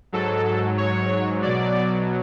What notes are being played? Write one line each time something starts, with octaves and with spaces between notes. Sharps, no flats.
G#2 F#3 A4
C#5
B2 F#3 D5